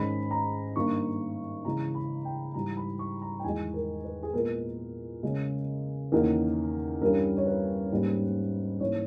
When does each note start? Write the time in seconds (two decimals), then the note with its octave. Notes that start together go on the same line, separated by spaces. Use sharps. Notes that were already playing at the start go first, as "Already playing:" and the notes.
Already playing: G#2 D#3 G#3 C#4 B5
0.31 A#5
0.76 G2 D#3 A#3 C#6
1.65 C#3 E3 G#3 A#5
1.95 B5
2.25 G5
2.54 G#2 E3 G3 A#5
2.77 B5
2.99 C#6
3.22 A#5
3.39 G5
3.44 E2 D#3 G#3 G#5
3.74 A#4
4.04 B4
4.23 G#4
4.33 A#2 G#3 B3 A#4
5.23 C#3 G#3 C#4
6.12 E2 D#3 A#3 C#4 A#4
7.01 G2 E3 G3 C#4 A#4
7.37 C#5
7.46 B4
7.91 G#2 G3 A#3 C#4
8.80 G#2 E3 A#3 C#5